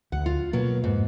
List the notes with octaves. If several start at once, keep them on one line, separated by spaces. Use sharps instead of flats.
D2 F#5
F4
B2 F#3 A#3 A#4 B4
F2 G#2